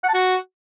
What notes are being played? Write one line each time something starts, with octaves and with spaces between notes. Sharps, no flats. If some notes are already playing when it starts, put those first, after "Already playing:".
F#5
A5
F#4